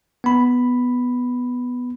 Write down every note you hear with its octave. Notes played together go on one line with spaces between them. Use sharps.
B3 B5